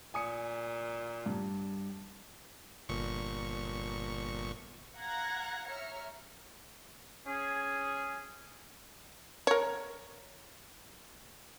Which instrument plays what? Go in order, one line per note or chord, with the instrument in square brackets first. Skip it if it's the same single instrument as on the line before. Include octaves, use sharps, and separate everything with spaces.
[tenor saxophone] A#2 [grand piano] G#5 D#6 C#7
[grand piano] G2
[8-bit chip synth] G1 A#2 C#6
[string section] F5 F#5 A#5 F#6 G#6 A#6
C#5 E5 A#5 F6 C#7
[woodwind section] C#4 G#4
[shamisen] A#4 C#5